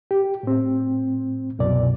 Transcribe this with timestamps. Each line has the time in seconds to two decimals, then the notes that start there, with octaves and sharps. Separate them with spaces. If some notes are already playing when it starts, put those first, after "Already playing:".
0.11 G4
0.43 A2 C4
1.59 C2 F#2 B2 D5